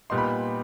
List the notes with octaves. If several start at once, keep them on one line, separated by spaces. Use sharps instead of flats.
A#2 G3 B3 D#4 C6
B5